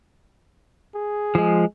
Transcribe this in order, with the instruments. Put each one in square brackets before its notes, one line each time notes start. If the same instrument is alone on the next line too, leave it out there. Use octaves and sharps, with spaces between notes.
[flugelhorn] G#4
[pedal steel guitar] F3 G#3